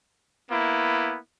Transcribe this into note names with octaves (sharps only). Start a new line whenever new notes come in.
A#3 B3 E4